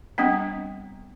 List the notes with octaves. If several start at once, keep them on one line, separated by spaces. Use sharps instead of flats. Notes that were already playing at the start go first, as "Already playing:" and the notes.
G3 B3 C4 D4